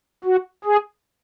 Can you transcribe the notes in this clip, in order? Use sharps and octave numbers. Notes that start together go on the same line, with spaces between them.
F#4
G#4